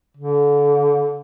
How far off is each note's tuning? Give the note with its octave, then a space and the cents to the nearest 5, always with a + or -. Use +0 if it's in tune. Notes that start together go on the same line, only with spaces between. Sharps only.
D3 -30